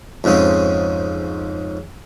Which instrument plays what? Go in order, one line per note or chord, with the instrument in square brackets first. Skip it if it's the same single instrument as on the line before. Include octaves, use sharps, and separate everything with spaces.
[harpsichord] F2 G#2 C#3 C4 C#4